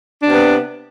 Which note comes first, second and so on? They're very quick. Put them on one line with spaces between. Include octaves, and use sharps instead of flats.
D4 C3 B3